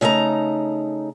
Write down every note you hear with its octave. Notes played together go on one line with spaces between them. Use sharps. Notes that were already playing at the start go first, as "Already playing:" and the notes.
C#3 A3 D#4 F5 A#5